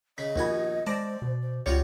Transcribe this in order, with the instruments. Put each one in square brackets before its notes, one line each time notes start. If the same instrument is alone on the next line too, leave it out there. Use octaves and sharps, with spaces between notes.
[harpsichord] C#3 [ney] D#5 [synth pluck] B6
[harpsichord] A#1 F#4 G#5 [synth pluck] D#2 B3
[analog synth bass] G#3 [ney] C5 [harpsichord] D5 [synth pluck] A5 A#6 D7
[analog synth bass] B2
[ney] C5
[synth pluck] C#2 C#5 [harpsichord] G3 F4 F#4 [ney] F#5